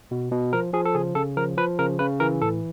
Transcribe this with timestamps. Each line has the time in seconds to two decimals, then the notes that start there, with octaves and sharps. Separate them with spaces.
0.11 B2
0.32 B2
0.53 F3 A#4
0.73 F3 G#4
0.85 A4
0.95 C#3 G#4
1.15 C#3 A4
1.37 F3 A#4
1.57 F3 B4
1.79 C#3 A#4
1.99 C#3 B4
2.20 E3 A#4
2.42 A2 A4